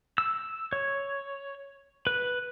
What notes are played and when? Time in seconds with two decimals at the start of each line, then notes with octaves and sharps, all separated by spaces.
0.18 E6
0.73 C#5
2.07 B4